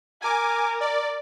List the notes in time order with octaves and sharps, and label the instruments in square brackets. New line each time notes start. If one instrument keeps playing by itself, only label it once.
[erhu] A#4 [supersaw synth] G#5 D6
[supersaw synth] D5